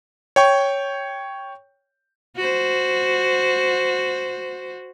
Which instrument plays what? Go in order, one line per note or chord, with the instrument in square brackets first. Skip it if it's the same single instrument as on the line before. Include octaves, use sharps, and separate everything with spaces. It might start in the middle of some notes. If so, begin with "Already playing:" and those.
[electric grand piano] C#5 G5 C#6
[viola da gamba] F#4 C5